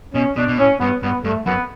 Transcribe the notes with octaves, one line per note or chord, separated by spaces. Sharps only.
B2 C#4
B2 D4
B2
A2 C#4
G2 B3
G2 B3
G2 A3
F#2 B3